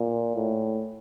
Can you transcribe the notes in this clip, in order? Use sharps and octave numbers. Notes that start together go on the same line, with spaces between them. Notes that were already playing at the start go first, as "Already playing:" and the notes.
Already playing: A#2
A2